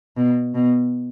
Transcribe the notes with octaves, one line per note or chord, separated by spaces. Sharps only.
B2
B2